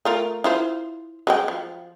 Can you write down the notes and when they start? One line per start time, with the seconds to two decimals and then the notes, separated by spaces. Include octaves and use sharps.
0.05 A3 F4 A#4
0.44 E4 F4 C5
1.27 F#3 G#3 G5
1.48 F3